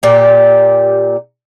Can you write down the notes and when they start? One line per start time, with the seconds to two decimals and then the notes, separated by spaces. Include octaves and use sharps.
0.03 A#2 G4